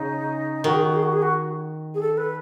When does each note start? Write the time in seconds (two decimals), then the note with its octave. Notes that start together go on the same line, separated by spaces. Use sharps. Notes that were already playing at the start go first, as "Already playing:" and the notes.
Already playing: C#3 D#4
0.64 D#3 F#4
0.73 G#4
0.83 F#4
0.94 G#4
1.02 F#4
1.12 G#4
1.22 F#4
1.94 G#4
2.00 A4
2.17 B4